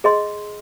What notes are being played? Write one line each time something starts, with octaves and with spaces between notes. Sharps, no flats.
G#4 D#5 C6